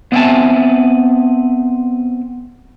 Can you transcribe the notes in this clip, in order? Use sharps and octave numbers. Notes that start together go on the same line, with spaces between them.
B3 C4 D#5 E5 G#5 A5